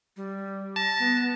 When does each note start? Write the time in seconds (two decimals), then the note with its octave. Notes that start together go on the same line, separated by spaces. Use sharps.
0.17 G3
0.76 A5 A#6
0.99 B3